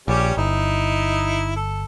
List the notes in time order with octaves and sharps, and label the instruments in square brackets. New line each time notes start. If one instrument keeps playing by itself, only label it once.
[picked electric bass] A#1 [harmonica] G3 C#4 G4
[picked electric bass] G1 [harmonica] D#4 E4
[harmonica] A4